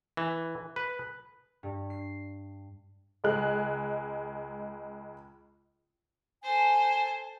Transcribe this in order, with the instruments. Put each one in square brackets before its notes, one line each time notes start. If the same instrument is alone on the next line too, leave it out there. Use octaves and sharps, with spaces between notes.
[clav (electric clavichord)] E3
B4
[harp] G2
C7
[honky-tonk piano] C#2 G#3 F#6
[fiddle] A4 C5 [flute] G#5